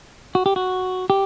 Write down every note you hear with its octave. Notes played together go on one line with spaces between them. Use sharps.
F#4
G4
F#4
G4